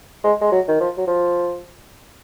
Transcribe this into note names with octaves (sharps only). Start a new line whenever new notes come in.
G#3
G#3
F#3
D#3
F3
F#3
F3